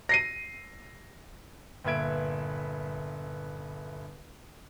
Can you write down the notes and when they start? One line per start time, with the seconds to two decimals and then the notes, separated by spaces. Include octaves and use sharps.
0.09 A#6 C7 D#7
1.84 G1 A#2 B4 E5 G#6 D7